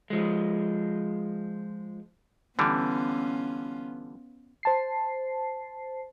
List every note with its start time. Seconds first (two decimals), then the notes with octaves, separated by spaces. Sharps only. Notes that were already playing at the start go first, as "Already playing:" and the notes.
0.10 F3 G#3
2.59 D3 E3 G3 B3 C#4 F4
4.63 C5 A5 C7